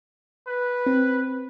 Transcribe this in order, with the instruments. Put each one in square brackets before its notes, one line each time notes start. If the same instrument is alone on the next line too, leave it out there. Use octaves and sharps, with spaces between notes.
[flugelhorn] B4
[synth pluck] C4